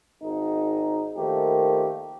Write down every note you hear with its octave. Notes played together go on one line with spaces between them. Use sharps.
G#1 D#4
D#3 F3 A3 A#3 G4